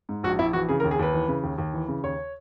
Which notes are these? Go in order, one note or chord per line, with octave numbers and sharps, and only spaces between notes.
G#2
A#1 F#4
A#1 E4
E3 F#4
C#3 G#4
A#4
D#2
G#4
D#2 B4
E3
C#3
D#2
D#2
E3
C#3
D#2 C#5